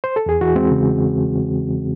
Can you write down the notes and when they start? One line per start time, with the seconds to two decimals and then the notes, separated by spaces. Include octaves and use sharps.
0.04 C5
0.16 A4
0.26 E2 G#4
0.41 E3 F#4
0.56 G#3 C4
0.71 C#3